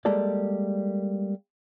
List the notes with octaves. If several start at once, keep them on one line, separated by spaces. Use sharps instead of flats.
G3 G#3 A#3 A4 A#4 D5